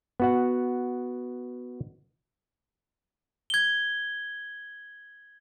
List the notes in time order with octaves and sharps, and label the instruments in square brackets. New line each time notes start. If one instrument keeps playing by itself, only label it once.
[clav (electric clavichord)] B3 F#4 F#5
[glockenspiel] G#6 G7